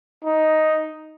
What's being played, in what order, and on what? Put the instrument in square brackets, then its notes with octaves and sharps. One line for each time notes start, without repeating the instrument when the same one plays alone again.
[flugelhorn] D#4